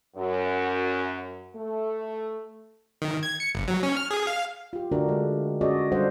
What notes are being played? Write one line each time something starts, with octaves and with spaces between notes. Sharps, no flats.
F#2
A3
D#3
G#6
C#7
G1
F#3
C#4
F6
G#4
F5
F4 G4
D3 A3 D4 F#4 A#4
G#3
C#4 F#4 G#4 B4 D5 D#5
G3 D4 A4 C5 F5 F#5